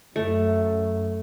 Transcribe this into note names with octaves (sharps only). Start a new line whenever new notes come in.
F#2 A3